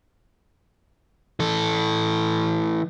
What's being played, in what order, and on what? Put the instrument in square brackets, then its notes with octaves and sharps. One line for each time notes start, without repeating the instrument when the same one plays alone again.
[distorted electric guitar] E3 A4